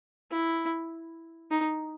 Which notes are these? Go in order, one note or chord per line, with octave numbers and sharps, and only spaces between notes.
E4
D#4